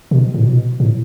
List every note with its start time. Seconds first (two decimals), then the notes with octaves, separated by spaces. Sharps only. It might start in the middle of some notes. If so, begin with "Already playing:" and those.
0.11 B2
0.34 A2
0.46 B2
0.80 A2